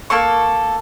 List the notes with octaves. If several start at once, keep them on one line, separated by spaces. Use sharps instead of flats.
A#3 A4 C#6